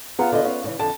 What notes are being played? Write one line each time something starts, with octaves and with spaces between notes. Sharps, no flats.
B3 F4 G#4 F#5 A#5
D3 D#5
C#4 F5
A2 C#3 E3
F2 D3 A5